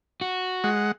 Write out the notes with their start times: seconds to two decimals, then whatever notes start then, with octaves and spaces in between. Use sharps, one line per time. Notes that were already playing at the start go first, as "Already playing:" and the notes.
0.21 F#4
0.64 G#3 F#5